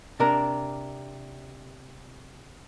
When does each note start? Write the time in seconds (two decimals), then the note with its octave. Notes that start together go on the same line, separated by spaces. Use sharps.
0.20 C3 D4 A#4